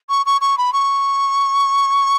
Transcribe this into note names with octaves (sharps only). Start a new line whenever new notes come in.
C#6
C#6
C#6
B5
C#6